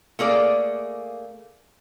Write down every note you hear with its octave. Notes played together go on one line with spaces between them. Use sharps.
A3 A#3 G#4 D5